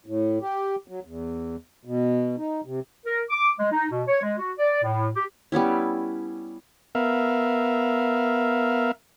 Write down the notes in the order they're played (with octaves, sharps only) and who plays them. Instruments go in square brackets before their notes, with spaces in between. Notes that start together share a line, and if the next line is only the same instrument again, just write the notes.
[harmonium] A2
G4
F#3
E2
B2
D#4
C3
[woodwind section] A#4
D6
G#3
D#4
B2
C#5
G#3
F#4
D5
A2
G4
[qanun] G3 B3 C#4 E4
[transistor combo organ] B3 A#4 E5 F5